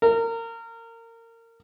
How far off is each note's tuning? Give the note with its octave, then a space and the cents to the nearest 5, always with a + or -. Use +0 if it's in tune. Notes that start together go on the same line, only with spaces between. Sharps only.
A#4 -25